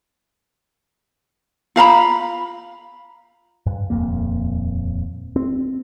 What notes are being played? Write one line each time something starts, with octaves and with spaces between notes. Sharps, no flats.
F4 F5 A#5 B5
G2
D#1 F2 A#3
C4